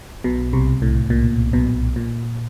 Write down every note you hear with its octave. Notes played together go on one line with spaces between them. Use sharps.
B1 B2
C2 C3
A2
A#2
B1 B2
A#2